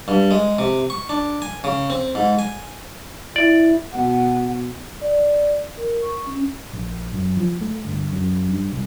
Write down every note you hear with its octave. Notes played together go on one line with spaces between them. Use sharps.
G2
G#3
C3
C#6
D4
G#5
C#3
C4
G#2
G#5
E4 D5
B2 F#5
D5
A#4
C#6
C#4
A#1
F#2
F3
A3
G1
F#2
G2
C2